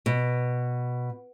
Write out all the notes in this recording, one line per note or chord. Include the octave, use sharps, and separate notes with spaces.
B2